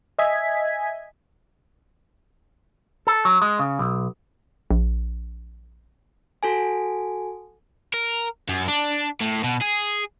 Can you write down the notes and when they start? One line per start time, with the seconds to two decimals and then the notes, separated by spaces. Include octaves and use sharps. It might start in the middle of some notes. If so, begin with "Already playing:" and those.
0.19 D#5 E5 G#5 G#6 B6
3.07 A4
3.25 F#3
3.42 G#3
3.59 C#3
3.79 B1
4.71 A#1
6.43 F#4 A4 G#5
7.94 A#4
8.49 F#2
8.68 D4
9.21 A2
9.44 B2
9.62 G#4